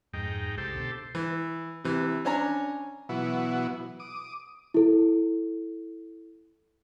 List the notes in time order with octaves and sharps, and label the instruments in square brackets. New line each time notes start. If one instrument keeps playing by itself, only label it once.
[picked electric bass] F2 [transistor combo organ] G#2 D#4 G5
[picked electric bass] C2 [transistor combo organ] G4 A4 C5
[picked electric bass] B2 D3
[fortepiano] E3
C3 E3
C#4 D4 C#5 G#5 A#5
[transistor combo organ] B2 E3 F#3 B3 E4 F#4
D6 D#6
[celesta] E4 A4